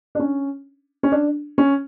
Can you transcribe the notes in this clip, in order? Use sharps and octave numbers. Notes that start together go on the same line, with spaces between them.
D4
C#4
C#4
D4
C#4